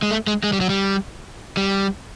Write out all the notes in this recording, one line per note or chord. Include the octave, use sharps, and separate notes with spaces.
G#3
A3
G#3
G#3
G3
F#3
G3
G3